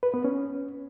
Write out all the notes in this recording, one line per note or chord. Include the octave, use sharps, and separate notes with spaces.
B4
B3
C#4